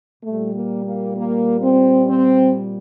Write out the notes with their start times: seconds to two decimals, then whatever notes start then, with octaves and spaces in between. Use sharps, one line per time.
0.23 A#2 A3
0.28 G3
0.54 A#3
0.85 A#3
1.15 A#3
1.61 C4
2.08 C4